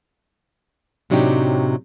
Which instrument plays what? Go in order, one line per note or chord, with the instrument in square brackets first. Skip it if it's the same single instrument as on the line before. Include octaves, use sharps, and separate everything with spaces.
[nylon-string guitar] A2 C3 F#3 D4 D#4 G4